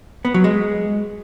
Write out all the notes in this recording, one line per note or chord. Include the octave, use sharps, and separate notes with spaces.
B3
F#3
G#3